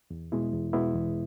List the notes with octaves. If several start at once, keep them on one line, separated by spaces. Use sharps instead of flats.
E2
B2 G#3 B3 E4
E2
B2 G#3 B3 E4
E2